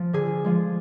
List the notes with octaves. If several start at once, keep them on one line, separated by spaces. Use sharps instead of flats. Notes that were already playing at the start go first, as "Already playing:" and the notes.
Already playing: F3
D3 G#4
F3 G#3